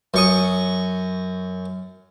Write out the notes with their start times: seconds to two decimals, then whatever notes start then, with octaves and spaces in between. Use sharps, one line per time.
0.14 F#2 C#6 D#6